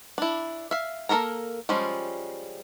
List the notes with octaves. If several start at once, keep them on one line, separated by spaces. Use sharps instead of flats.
D4 E4
E5 F5
A#3 F#4 A4 A#4 A#5
F3 G3 G#3 C#4